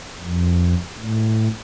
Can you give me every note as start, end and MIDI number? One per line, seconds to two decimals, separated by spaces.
0.21 0.75 41
1.00 1.48 45